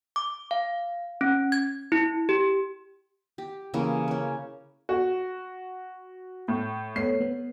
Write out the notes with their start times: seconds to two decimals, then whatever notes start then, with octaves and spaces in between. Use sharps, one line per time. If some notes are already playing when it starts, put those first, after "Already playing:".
0.16 D6
0.51 F5
1.21 C#4
1.52 G#6
1.92 E4
2.29 G4
3.38 G4
3.74 C#3 E3 A#3 C#4
4.08 A#3 C#4
4.89 F#4
6.48 A2
6.96 A3 B3 C#5 C7
7.20 B3